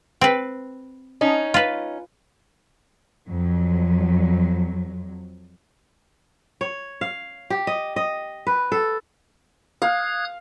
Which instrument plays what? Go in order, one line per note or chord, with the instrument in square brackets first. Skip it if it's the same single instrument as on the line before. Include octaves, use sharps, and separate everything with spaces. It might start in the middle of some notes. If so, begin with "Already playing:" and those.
[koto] C4 B4
[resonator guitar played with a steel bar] C#4 D#4
[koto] F4 B4
[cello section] F2 F#3
[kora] C#5
F5
G4
D#5
D#5
B4
A4
[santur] F5 [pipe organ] D#6 F#6 G#6